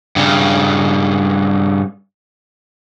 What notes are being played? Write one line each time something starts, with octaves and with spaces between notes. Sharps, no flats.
G2 C#3